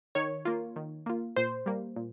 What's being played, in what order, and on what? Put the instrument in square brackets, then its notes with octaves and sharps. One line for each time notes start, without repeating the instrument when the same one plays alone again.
[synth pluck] D#3 C#5
A#3 F4
D#3
A#3 F4
A#2 C5
G3 A#3
A#2